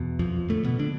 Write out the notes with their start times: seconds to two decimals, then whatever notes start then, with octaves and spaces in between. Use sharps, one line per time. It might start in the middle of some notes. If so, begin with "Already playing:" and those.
Already playing: E2 B2
0.19 F2 F3
0.49 F2 A2 D3 A3
0.64 B2 B3
0.79 D3 D4